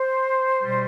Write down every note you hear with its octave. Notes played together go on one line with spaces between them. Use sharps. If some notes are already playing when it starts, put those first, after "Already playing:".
Already playing: C5
B2 G3